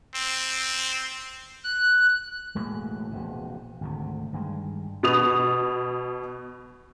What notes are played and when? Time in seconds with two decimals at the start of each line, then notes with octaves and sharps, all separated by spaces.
0.15 C4
1.64 F#6
2.55 E1 A2 G#3 A#3
3.11 E1 A#1 C3
3.81 G#1 D2 C3
4.33 G2 D#3 G#3
5.03 B2 D#6 F7